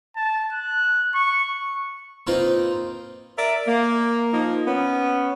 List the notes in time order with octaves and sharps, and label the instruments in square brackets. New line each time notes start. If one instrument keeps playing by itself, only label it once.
[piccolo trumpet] A5
F#6
C#6
[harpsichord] A#3 C4 D#4 F4 B4
[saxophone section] A#4 D5 E5
A#3
F3 A#3 D#4
B3 C#4